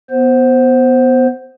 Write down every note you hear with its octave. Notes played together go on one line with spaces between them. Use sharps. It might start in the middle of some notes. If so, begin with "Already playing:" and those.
B3 C5